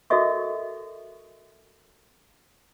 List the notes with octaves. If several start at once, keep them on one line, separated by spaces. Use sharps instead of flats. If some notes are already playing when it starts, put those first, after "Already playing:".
F#4 A4 A#4 D#5 E5 C#6